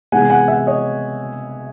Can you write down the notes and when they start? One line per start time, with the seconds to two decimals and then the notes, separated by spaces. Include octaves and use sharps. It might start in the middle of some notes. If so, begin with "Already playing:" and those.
0.12 C3 E3 G#3 B3 F#5 G#5
0.30 F#5 G#5
0.48 E5 F#5
0.67 C#5 D#5